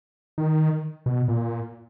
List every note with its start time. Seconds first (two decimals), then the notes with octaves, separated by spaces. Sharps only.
0.38 D#3
1.06 B2
1.28 A#2